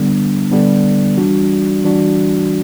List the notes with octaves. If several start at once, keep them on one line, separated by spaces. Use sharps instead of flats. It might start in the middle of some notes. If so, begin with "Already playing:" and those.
Already playing: D3 G3 B3 D4
D3 G3 B3 D4
E3 G3 D4 F#4
E3 G3 D4 F#4